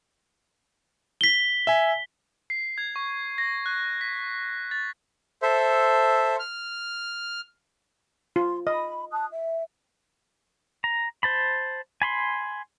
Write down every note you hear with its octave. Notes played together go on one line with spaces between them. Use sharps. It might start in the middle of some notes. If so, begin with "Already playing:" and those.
B6 G7
E5 G#5
C7
G#6
C#6
A#6
F#6
B6
A6
A4 C5 E5
F6
F4 C6
D#5 B5
A5 D#6 F#6
E5
A#5
C5 A5 B5
G#5 B5 C6